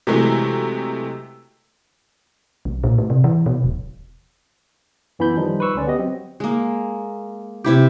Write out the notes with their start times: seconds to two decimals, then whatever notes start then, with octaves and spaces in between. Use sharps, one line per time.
0.07 C3 E3 F#3 G#3 A3
2.65 B1
2.84 A#2
2.98 A2
3.10 C3
3.24 E3
3.46 B2
3.64 D#1
5.19 F#2 E3 B3 E4 B5 G6
5.37 D#3 F3 G3 D#4
5.60 B4 C6 C#6 E6
5.75 C#2 D3 C#4 D5
5.87 B3 G4 D#5
5.99 F#3 C4
6.40 G#3 A#3
7.64 C3 E4 G4